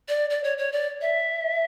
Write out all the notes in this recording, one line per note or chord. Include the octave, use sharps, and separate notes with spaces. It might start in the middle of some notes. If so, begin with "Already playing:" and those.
D5
D5
C#5
C#5
D5
E5